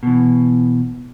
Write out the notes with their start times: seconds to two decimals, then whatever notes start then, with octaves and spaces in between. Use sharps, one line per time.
0.03 B2 E3